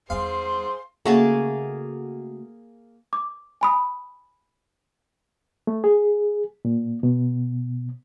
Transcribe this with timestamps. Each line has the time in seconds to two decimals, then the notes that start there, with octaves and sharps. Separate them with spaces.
0.10 E2 G3 G#4 C5 F5 C6
1.05 C#3 A3 A#3 F#4 G#4 A5
3.13 D6
3.61 G#5 B5 D#6
5.67 A3
5.84 G#4
6.65 A#2
7.03 B2